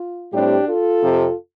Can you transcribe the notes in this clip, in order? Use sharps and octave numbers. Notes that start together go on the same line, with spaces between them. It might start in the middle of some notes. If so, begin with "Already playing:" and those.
Already playing: F4
A2 G3 C4 D4 G4
F4 A4
F2 C3 F3